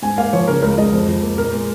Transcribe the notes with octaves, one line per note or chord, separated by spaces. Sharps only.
G#2 G#5
A#3 F5
F3 C#5
C#3 A#4
C#2 A#4
C#2 D#5
F2
F2
A#3
A#2 A#4
G#3